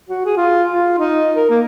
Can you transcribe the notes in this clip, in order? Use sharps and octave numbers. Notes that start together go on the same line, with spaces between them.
F#4
G#4
F4
F4
D#4
A#4
A#3